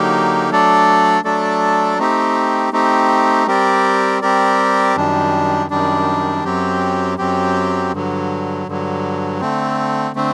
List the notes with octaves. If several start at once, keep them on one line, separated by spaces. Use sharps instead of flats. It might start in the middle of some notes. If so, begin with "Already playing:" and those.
Already playing: D3 F#3 A#3 D#4 G4
F#3 A3 D4 A4 D5
F#3 A3 D4 A4 D5
A3 C4 D#4 G4
A3 C4 D#4 G4
G3 C4 G4 A#4 D5
G3 C4 G4 A#4 D5
F#2 D#3 G3 D4
F#2 D#3 G3 D4
F#2 F#3 C4 G4
F#2 F#3 C4 G4
G2 D3 F#3
G2 D3 F#3
D3 A3 C4
D3 A3 C4